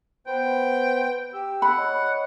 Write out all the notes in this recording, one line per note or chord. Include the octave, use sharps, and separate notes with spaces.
B3 B4 C5 G5
G4 E6
F#5 B5
C#5 D#5